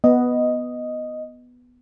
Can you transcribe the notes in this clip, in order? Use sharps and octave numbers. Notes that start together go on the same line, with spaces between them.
B3 D#5